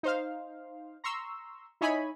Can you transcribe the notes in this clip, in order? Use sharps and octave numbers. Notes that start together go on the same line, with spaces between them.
D#4 C5 F5
A#5 C6 C#6 E6
D#4 E4 C#5 D#5 G#5 B5